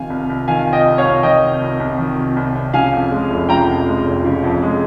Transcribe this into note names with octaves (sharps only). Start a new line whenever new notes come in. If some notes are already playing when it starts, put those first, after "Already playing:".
Already playing: C3 D#3 F5 G#5
C2
C2
D#3 F5 G#5
C3 G#5
D#5 G5
C2
C#5 F5
C2
D#3 D#5 G5
C3
C2
C2
D#3
C3
C2
C2
C#3 F5 G#5
F2
G#3
F1
C#3 G5 A#5
F2
G#3
F1
C#3
F2
G#3